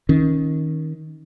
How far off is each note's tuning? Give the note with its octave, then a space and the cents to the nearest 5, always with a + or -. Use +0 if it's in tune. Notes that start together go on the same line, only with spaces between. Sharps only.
D#3 +15 C#4 -15